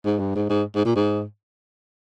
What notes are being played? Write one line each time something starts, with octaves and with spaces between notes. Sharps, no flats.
G#2
G2
G#2
G#2
G#2
A#2
G#2